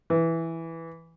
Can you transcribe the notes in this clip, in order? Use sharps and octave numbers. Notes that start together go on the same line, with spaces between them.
E3